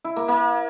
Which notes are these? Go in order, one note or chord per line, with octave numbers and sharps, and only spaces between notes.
E4
A#3
A#3